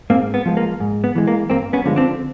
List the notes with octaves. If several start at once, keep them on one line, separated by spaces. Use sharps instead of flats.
G#2 A#3 C4
B3
F3 G#3
A#3
G#2
B3
E3 G#3
A#3
G2 A#3 C4
B3 C#4
D3 F3 G#3
C4 D4